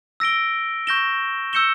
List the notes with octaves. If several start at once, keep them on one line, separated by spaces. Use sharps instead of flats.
E6 A#6 D7 G7
C#6 G6 A#6 E7 G7
E6 G6 C#7 E7 G7